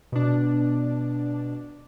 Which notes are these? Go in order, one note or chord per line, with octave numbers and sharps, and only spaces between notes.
B2 D4